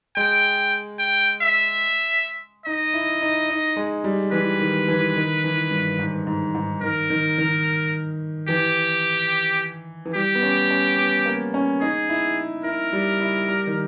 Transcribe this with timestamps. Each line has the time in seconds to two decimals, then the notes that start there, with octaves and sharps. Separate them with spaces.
0.16 G#3 G5
0.99 G5
1.42 E5
2.66 D#4 D#5
2.94 E4
3.22 D#4
3.50 D#4
3.76 G#3
4.04 G3
4.32 E3 B4
4.60 D#3
4.88 E3
5.16 D#3
5.44 E3
5.71 G2
5.98 G#2
6.27 G#2
6.54 G#2
6.82 D#3 A#4
7.10 D#3
7.38 D#3
8.49 E3 G4
10.05 E3
10.15 G3 G4
10.35 B3
10.43 C#4
10.71 C#4
10.98 B3
11.26 A#3
11.54 C#4
11.81 D#4 G#4
12.09 E4
12.64 E4 A#4
12.93 G3
13.21 E4
13.48 G3
13.67 D#3